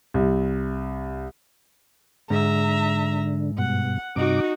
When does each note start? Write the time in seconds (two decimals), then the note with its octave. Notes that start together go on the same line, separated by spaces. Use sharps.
0.14 C2
2.30 G#2 D3 E5 A#5
3.58 G2 B2 F#5
4.16 G2 C3 D#4 F#4 D6